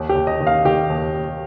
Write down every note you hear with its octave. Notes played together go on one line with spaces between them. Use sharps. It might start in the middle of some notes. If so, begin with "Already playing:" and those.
Already playing: D#2
G4
D#2
D#5
D#3
F5
D#3 G4
D#2
D#2